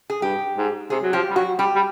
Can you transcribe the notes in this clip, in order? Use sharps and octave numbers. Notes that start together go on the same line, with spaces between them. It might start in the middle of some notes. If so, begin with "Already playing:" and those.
G#4
G2 G4
G#2
C3 G#4
F#3
F3 G4
G3
F#3 F#4
G3 G4
G3